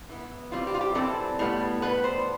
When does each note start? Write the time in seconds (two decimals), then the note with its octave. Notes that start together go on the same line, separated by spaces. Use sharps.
0.09 E3 B3
0.52 E3 G3 C4 F4
0.67 G4
0.74 F4
0.81 G4
0.95 E3 G3 C4 A4
1.39 A2 G3 B3
1.82 A2 G3 B3 B4
2.04 C5